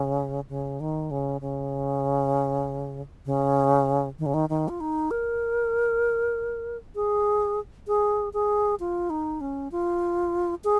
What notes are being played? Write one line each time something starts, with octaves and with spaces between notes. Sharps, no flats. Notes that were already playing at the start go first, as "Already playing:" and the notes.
Already playing: C#3
C#3
D#3
C#3
C#3
C#3
D#3
C#3
D#3
D#3
F4
D#4
A#4
G#4
G#4
G#4
F4
D#4
C#4
F4
G#4